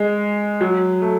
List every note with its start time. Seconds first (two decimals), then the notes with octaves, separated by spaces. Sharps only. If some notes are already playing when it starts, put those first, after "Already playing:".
Already playing: G#3
0.61 F#3
1.02 A3